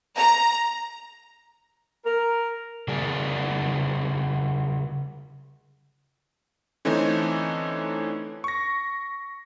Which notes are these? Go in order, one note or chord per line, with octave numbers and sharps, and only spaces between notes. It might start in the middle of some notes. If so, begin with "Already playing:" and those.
A#5
A#4
C#3 G3 G#4 A#4 D5 G#5
D3 E3 A3 C4 C#4 D#4
C#6 A#6